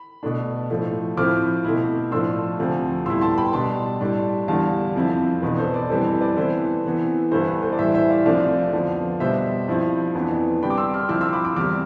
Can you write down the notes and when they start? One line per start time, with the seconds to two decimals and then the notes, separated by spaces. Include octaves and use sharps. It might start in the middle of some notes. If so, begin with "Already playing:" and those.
Already playing: B5
0.23 B2 A3 D4
0.70 A2 F3 A3
1.17 A2 F3 C4 E4 D6 F6
1.65 B2 A3 C4 E4
2.11 A2 F3 A3 D4 C6 E6
2.59 D2 C3 F3 A3
3.06 A2 G3 B3 E4 C6 E6
3.21 A5 C6
3.37 G5 B5
3.53 B2 G3 D4 A5 C6
4.01 A2 G3 D4
4.48 E2 D3 G3 F5 A5
4.95 F2 C3 F3 C4 E4
5.42 E2 B2 B3 D4 B4
5.58 A4 C5
5.74 B4 D5
5.89 F2 C3 E3 G3 C4 A4 C5
6.05 B4
6.21 B4 D5
6.37 C3 E3 B3 E4 A4 C5
6.84 C3 E3 B3
7.31 G2 E3 B3 E4 A4 C5
7.47 B4
7.63 A4 C5
7.73 D5
7.78 A2 E3 G3 C5 E5
7.94 C5 E5
8.10 D5 F5
8.26 C2 C3 F3 A3 D4 D5 F5
8.73 F2 D3 F3 B3
9.20 B2 G3 D4 C5 E5
9.68 G2 F3 C4 E4
10.15 F2 E3 B3 D4
10.62 C3 G3 D4 G5 B5
10.70 D6
10.77 C6 E6
10.93 D6 F6
11.09 C3 F3 C4 E4 D6 F6
11.21 C6 E6
11.33 B5 D6
11.45 B5 D6
11.56 E2 C3 G3 D6 F6